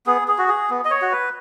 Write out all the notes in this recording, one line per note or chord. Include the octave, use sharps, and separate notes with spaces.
B3 G#4
G#4
F#4
G#4
B3
D#5
C#5
F#4
B4